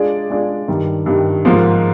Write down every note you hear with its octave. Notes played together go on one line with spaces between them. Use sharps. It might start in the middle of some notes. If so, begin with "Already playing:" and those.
Already playing: G#3 D4 F4 G#4 D5
G#3 D4 F4 G#4 D5
G2 D#3 G3
G2 D#3 G3
G#2 F3 A#3 F4